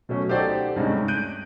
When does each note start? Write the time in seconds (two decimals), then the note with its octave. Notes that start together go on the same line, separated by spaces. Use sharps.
0.09 B2 F#3 A3 C#4
0.29 D#4 G4 A4 C5 D5 F#5
0.76 G2 C3 G#3 A3 C#4 D#4
1.08 F#6 G6 D7 D#7